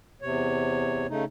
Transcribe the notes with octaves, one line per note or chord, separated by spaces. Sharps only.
E2 C3 C#5
C#3 A3 D#4